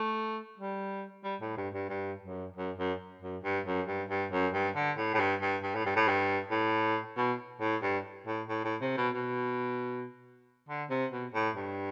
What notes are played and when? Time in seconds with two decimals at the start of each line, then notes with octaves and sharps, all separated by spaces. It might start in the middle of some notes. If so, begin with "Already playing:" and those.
Already playing: A3
0.58 G3
1.24 G3
1.41 A2
1.57 G2
1.74 G2
1.89 G2
2.23 F#2
2.56 F#2
2.77 F#2
3.22 F#2
3.44 G2
3.66 F#2
3.88 G2
4.10 G2
4.32 F#2
4.53 G2
4.76 D3
4.97 A2
5.14 A2
5.19 G2
5.42 G2
5.63 G2
5.75 A2
5.86 G2
5.96 A2
6.08 G2
6.51 A2
7.17 B2
7.61 A2
7.83 G2
8.27 A2
8.49 A2
8.65 A2
8.81 C3
8.97 B2
9.14 B2
10.69 D3
10.90 C3
11.12 B2
11.34 A2
11.55 G2